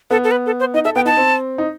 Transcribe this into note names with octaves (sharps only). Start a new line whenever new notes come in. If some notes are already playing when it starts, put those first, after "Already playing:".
B3 A4
A4
B4
A4
C5
D#4 D#5
A4 E5
B3 G5
D#4 A5
C4
D#4